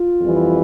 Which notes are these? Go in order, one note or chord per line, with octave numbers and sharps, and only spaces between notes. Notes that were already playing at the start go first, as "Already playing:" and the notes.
Already playing: F4
F2 E3 G3